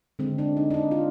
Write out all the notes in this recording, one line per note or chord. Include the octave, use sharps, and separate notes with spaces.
D3 G#3 C4
D4
D#4
D4
D#4
F4